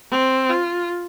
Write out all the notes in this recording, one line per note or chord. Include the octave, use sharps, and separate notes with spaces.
C4
F4